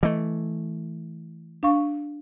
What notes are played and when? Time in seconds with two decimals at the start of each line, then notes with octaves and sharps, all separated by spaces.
0.03 E3 A3 D#5
1.63 D4 F5 C#6